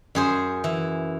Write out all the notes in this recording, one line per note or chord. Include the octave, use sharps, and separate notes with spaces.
F#2 G#4 C5
E3